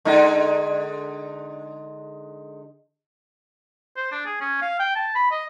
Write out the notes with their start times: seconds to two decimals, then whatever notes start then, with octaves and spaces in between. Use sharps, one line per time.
0.05 D3 G#3 D#4
3.97 C5
4.12 D4
4.26 G#4
4.41 C#4
4.62 F5
4.80 G5
4.96 A5
5.15 B5
5.31 D#5